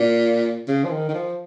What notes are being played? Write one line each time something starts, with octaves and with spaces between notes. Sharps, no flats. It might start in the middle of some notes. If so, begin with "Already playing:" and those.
Already playing: A#2
C#3
F3
D#3
D#3
F3